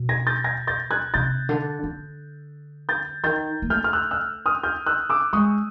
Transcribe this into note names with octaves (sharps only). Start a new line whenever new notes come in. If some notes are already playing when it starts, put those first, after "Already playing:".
Already playing: B2
G#6 A#6
G6 A6
G#6 A#6
G6 A6
F#6 G#6
C3 G6 A6
D3
D3
G6 A6
D#3 G6 A6
A#3
A3 F6 G6
F6
E6 F#6
E6 F#6
D#6 F6
F6 G6
E6 F#6
D6 E6
G#3 C#6 D#6